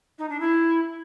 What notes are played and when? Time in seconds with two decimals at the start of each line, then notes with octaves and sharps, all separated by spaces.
0.19 D#4
0.29 D4
0.40 E4